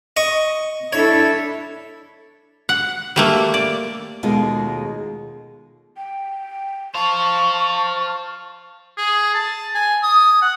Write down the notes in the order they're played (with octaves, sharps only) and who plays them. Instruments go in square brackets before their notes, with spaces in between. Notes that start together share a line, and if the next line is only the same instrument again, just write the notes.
[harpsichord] D#5 C#6
[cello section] D4 E4 A4 [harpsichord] C#5
[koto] F#5
G3 A3 A#3
D5
[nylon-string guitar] D#2 B2 G#3 A3 F4 D#5
[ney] G5
[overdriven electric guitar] C5 F5 [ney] A5 [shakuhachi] C#6
[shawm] G#4
A5
G#5
D#6
F#5